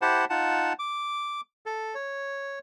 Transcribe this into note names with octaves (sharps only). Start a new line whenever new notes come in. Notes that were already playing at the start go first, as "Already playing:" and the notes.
E4 G4 C5 F#5 A5
D#4 F4 F#5 A5
D6
A4
C#5